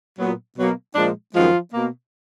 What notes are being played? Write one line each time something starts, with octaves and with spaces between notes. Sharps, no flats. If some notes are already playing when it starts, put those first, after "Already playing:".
A#2 F#3 B3
B2 F#3 A#3
A#2 F3 G#3 D4
F#2 D#3 F3 G#3 B3 F4
B2 A#3